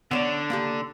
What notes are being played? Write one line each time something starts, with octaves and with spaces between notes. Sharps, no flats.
D3 B3 C#5 D5
A#3 D4 G4